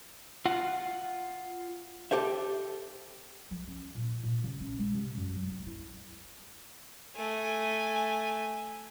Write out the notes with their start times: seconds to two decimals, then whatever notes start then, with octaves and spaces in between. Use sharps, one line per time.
0.45 F4 F#5
2.11 G4 A4 C5 E5
3.51 F3
3.67 C#4
3.95 A#2
4.23 A#2
4.44 C#3
4.60 C#4
4.78 G#3
4.95 C3
5.17 F#2
5.35 F#3
5.51 B3
5.66 E4
7.16 A3 G#5